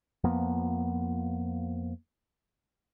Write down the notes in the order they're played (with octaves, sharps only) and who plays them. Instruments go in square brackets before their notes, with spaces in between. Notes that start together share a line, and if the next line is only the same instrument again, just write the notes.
[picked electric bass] F2 F3 A#3 B3